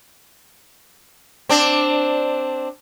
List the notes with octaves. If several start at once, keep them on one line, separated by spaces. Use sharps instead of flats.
C4 D4